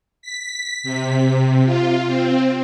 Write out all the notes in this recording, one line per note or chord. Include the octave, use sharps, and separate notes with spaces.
B6
C3
F4
C4